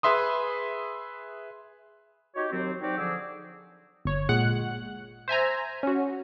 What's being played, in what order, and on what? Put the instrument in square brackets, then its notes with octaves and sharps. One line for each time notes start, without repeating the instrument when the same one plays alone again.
[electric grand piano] G#4 B4 E5 C6 D#6
[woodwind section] D#4 F#4 G4 C#5
D#2 F#3 C4
C4 D#4 F#4 G4 D5
D3 F3 G#4 D6 E6
[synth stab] G1 C#5
A#2 G#3 F#5 F#6
C5 E5 G#5 A#5
C#4 F#4